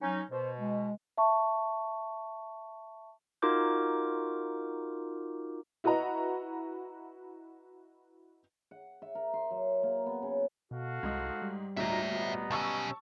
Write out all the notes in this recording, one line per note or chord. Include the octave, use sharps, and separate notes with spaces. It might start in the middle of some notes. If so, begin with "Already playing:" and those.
F#3 C#4 D#4
B2 C5
G#3
E5 A5 C#6
D#4 F4 F#4 A#4 D6 G6
E4 F#4 B4 D#5 A#5
F#5
E5
A#4
C6
F#3
A#3
B3
C#3
B2 F#4 A4 F5
C2 G#2 D#5
G3
D2 A#2 D#4 C#5 E5 A#5
B3 D#5 A#5
B1 C#4 A5 C#6 E6